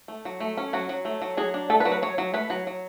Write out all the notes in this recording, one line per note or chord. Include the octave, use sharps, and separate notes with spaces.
A3
F#3
A3
C#4
F#3 F#4
F#3
A3
F#3
F#3 G#4
D4
A3 A4
B4
F#3
B4
F#3 C#5
F#3
A3 B4
F#3
F#3